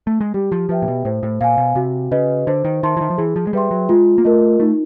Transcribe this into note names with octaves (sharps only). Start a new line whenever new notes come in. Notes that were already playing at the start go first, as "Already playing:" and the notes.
A3
G#3
G3 G4
F3
F3 B4 E5 G5
A#2
B2
A2 C5
A2
A#2 F5 G#5
B2
C3 F#4
C#3 B4 D#5
D3 C5
D#3
D#3 E5 A5 C6
E3
D#3
F3
E3 G#4
F3
G#3
G3 B4 E5 G5 C6
F#3
G#3 F4
A#3
A3 A#4 D#5
A3 D#4